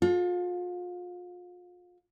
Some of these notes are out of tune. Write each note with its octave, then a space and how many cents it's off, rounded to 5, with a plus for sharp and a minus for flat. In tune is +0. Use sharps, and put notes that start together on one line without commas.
F4 +35 A4 -30